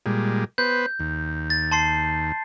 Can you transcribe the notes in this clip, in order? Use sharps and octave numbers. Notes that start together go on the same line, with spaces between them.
A#2 G3 G#3
B3 B4 C5 G6
D#2
A6
A5 C6 C7